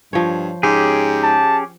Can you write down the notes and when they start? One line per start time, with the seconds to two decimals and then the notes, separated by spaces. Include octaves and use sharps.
0.13 G2 F3 C#5
0.63 G#2 C#4 G4 G#4
1.23 A5